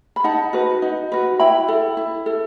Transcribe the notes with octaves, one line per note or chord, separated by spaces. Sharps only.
B5
D#4 F#5 A5
F#4 B4
D#4
F#4 B4
E4 G5 B5
A4
E4
A4